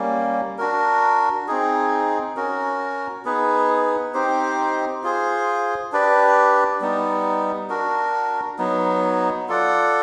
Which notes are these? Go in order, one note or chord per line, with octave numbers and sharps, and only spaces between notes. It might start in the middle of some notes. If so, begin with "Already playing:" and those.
Already playing: G3 A#3 C#4
D4 F#4 A#4
C4 D#4 G#4
C#4 F#4 A#4
B3 D#4 G#4 B4
C4 D#4 G4 C5
F4 G#4 C5
D4 G4 B4 D5
G3 B3 D#4
D4 F#4 A#4
F#3 B3 D#4
F4 A4 D5 F#5